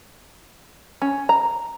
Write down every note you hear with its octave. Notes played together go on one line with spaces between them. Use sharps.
C#4
A#5